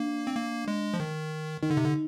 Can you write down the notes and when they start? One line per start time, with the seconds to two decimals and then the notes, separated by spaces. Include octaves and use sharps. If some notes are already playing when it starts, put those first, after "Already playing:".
Already playing: A#3 D4
0.27 C4
0.36 A#3
0.68 G#3
0.94 F3
1.00 D#3
1.62 D#3 D#4
1.70 D3
1.77 C3
1.85 D3